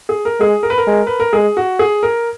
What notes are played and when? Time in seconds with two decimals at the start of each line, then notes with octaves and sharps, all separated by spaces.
0.09 G#4
0.25 A#4
0.40 G#3 G#4
0.63 A#4
0.70 B4
0.78 A#4
0.87 G#3
1.07 B4
1.20 A#4
1.33 G#3 G#4
1.57 F#4
1.79 G#4
2.03 A#4